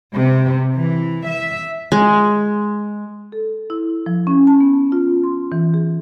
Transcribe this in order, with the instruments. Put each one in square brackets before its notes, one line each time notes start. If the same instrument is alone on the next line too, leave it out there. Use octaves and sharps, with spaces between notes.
[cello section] C3
E3
E5
[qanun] G#3
[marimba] A4
E4
F3
C#4
A5
B3
F4
C6
E3
G#4